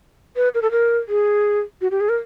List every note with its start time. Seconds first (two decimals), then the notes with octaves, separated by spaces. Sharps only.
0.36 B4
0.54 A#4
0.62 A4
0.71 A#4
1.09 G#4
1.81 F#4
1.91 G4
2.00 G#4
2.09 A#4